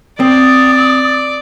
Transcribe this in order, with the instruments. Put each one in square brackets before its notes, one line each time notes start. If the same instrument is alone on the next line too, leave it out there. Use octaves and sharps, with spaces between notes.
[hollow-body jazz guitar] C4 [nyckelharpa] D5 [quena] D#6